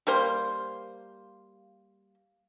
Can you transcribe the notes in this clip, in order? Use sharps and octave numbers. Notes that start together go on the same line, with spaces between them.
G3 A#3 C5